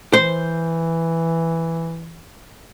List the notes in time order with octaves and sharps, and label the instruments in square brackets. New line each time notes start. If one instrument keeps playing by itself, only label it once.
[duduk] E3 [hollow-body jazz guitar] C5